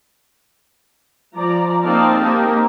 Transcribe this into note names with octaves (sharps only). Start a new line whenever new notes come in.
F3 D5 A#5
A#3 C4 D#4 D5 F5 A5
A#3 C4 D#4 G4 A#4